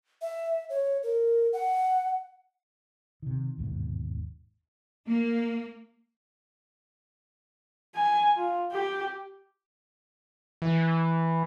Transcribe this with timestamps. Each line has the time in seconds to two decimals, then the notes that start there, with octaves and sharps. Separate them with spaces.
0.22 E5
0.69 C#5
1.03 A#4
1.53 F#5
3.22 C3 D#3
3.58 G1 D#2 G#2 B2
5.08 A#3
7.95 G#5
8.36 F4
8.71 G4
10.62 E3